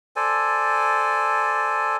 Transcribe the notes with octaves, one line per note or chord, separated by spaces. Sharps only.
A4 C5 D5 G#5